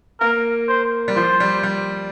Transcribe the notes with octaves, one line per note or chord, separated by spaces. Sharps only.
A#3 A#4
C5
G3
F3 C5
G3
G3